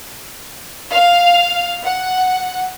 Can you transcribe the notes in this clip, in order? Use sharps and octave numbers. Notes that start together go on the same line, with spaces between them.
F5
F#5